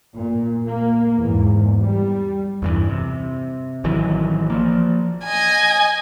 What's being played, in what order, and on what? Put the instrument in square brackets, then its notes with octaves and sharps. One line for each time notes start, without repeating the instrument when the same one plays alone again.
[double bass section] A#2
A#3
E2 G#2
G3
[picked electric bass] E2 G2 E3
C3
A1 D#3 E3 F#3
F3 A#3
[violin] D#5 G#5